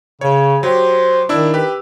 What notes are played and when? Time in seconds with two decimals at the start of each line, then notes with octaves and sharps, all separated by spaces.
0.21 C#3 C#5
0.63 F#3 G4 C5
1.29 D#3 D4 E4 E6
1.54 G4 B4